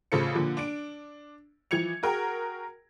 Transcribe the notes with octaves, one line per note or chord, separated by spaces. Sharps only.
A1 C#3 F4 A4 C5 C#7
A#2 D3 F3
D4 D7
E3 F3 G#6 C#7 F7
F#4 G#4 A#4 G5